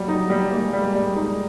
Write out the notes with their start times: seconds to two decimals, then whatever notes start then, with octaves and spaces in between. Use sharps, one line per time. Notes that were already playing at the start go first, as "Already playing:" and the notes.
Already playing: F#3 G3
0.08 D#4
0.30 G3
0.51 G#3 A#3
0.73 G3
0.94 G3
1.16 D#4